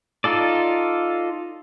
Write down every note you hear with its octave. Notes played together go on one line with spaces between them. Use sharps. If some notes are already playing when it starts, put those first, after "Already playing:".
D#4 F4 A4 D5